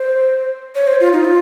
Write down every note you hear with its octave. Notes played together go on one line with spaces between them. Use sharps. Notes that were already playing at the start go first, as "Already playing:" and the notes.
Already playing: C5
C#5
C5
F4
D#4
F4